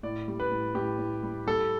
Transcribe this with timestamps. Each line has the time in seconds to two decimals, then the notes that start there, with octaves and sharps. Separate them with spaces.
0.03 A2 D5
0.28 G3
0.40 B4
0.51 A2
0.75 A2 G4
0.99 A2
1.23 G3
1.47 G3 A4